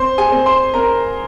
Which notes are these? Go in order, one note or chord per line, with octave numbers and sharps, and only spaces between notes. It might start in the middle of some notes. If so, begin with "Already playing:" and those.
Already playing: C4 C5 C6
G#4 G#5
C4
C5 C6
C4 A#4 A#5